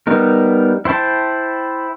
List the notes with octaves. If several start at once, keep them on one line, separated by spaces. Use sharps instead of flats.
G3 B3 D#4 A#4
E4 C5 G5 A5